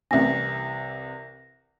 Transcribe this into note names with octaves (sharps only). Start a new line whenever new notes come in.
C2 C3 E3 A3 C4 C#4 A#6